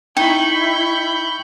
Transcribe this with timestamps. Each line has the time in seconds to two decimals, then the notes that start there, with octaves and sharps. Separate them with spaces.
0.17 D#4 E4 G5 B5 C#6 G6